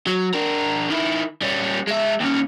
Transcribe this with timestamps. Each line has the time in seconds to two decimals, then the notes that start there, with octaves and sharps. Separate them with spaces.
0.07 F#3
0.34 D4 A#4
0.90 D#3 E4
1.42 G3 C#4
1.87 G#3 E5
2.20 D#2 C#4